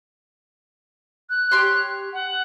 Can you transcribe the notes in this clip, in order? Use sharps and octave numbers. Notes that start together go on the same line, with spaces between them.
F#6
G4 C#5 C6
F#5